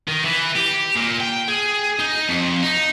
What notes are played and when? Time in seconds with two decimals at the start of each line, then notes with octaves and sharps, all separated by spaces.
0.08 D#3
0.25 E3
0.56 G4
0.96 A#2
1.20 G5
1.48 G#4
2.00 D#4
2.28 F2
2.63 D#4